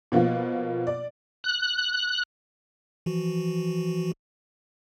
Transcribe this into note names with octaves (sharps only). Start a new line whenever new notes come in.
B2 F3 A#3 B3 F4
D5
F#6
E3 F3 F#4